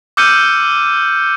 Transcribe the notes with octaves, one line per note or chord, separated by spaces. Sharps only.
D6 E6 F6 G6 C#7 D#7